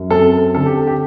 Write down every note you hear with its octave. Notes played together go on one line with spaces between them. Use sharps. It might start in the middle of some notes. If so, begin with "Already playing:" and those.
Already playing: F#2
C4 A4
D3 A4
G4
G4